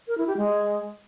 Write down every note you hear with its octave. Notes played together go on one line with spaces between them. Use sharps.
A#4
E4
G4
G#3